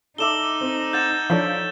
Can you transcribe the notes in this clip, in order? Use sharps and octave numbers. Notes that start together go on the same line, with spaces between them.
D#4 A4 D5 E5 E6 E7 G7
C4
F#5 G6 A6 E7
F3 D4 A4 C#5 E6